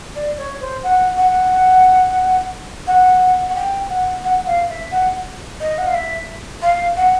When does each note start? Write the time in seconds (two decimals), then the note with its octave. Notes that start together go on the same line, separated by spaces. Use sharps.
0.15 D5
0.38 C#5
0.61 C5
0.83 F#5
1.17 F#5
2.87 F#5
3.49 F#5
3.56 G5
3.89 F#5
4.24 F#5
4.46 F5
4.69 E5
4.91 F#5
5.60 D#5
5.78 F#5
5.86 F5
5.95 E5
6.62 F5
6.96 F#5